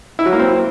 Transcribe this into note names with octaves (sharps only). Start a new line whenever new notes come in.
E4
F#3
A#3
C4